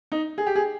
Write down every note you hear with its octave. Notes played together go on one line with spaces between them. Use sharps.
D#4
G#4
G4
G#4